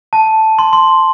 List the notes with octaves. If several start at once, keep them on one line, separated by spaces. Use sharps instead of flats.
A5
C6
C6